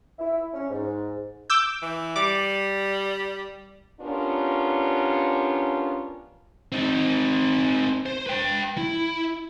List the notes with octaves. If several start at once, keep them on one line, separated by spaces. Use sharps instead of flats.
E4
C#4
G#2
D6 E6 G6
E3
G3 D6
B3 C#4 D4 F4 G4 A#4
C4 D#4
C5
B4 G5
E4